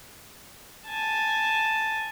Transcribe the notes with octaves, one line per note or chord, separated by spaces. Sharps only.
G#5 A5